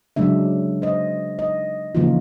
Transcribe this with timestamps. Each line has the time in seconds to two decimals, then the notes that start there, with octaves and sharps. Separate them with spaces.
0.16 C#3 F#3 G#3 D4 E5
0.82 C5 D#5
1.39 D#5
1.95 C#3 E3 F3 A#3 D#4 F4